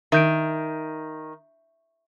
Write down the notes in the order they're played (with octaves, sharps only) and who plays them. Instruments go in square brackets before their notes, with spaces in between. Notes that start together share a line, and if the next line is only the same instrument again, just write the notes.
[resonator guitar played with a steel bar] D#3 [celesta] E5 G6 D7